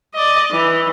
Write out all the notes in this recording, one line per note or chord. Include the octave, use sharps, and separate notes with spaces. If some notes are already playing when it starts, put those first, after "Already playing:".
D5 D#5
E3